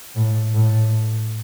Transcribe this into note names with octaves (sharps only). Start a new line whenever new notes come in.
A2
A2